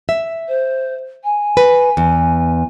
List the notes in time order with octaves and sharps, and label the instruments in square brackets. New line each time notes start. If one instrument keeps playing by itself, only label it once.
[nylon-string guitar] E5
[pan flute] C5
G#5
[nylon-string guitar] B4
E2